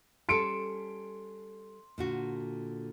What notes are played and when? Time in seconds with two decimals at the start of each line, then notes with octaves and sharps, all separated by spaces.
0.29 G3 C#4 A4 C6 C#7 D7
1.98 A#2 D3 F#4